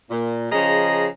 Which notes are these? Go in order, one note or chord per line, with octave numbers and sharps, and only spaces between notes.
A#2
C#3 F3 G#4 D#5 A#5